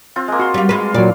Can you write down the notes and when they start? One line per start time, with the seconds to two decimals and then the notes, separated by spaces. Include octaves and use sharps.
0.16 C4 F4
0.28 G#3 A#3
0.39 F#4 F5 C6
0.54 G3 F4
0.69 G#3 F4 B4 F5
0.94 A#2 F#3 D5